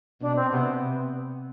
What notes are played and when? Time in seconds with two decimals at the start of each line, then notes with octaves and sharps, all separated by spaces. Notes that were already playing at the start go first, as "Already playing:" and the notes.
0.20 B2 D4
0.36 C4
0.52 C3 B3